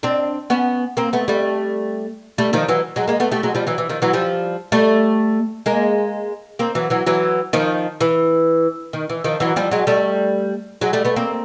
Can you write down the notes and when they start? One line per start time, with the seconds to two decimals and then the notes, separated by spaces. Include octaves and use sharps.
0.03 C4 D4
0.50 B3 C#4
0.97 A#3 C4
1.13 A3 B3
1.28 G3 A3
2.38 G3 A3
2.53 D#3 F3
2.69 E3 F#3
2.96 F#3 G#3
3.08 G#3 A#3
3.20 A3 B3
3.31 G3 A3
3.43 F#3 G#3
3.55 F3 G3
3.67 E3 F#3
3.78 E3
3.89 D#3 F3
4.02 E3 F#3
4.13 F3 G3
4.72 G3 A3
5.66 G#3 A#3
6.59 A#3 C4
6.75 E3 F#3
6.90 E3 F#3
7.07 E3 F#3
7.53 D#3 F3
8.01 E3
8.93 D#3
9.10 E3
9.24 D#3 F3
9.40 E3 F#3
9.56 F3 G3
9.71 F#3 G#3
9.87 G3 A3
10.81 F#3 G#3
10.93 G3 A3
11.05 A3 B3
11.16 A#3 C4